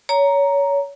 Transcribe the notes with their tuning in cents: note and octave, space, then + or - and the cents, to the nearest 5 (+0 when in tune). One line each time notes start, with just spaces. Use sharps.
C#5 +25 A#5 +0